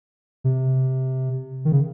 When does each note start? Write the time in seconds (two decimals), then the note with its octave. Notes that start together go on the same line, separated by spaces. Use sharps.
0.44 C3
1.65 D#3
1.72 C#3